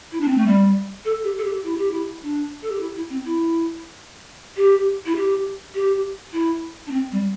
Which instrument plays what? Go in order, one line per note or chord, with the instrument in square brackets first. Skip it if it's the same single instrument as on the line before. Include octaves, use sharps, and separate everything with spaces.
[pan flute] E4
D4
C4
A3
G3
A4
G4
A4
G4
E4
G4
E4
D4
A4
G4
E4
E4
C4
E4
G4
E4
G4
G4
E4
D4
C4
G3